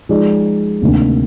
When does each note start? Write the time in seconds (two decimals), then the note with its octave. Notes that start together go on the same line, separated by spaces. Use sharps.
0.09 F3 G#3 D#4 G#4 D5
0.82 D2 C3 D#3 A#3 D4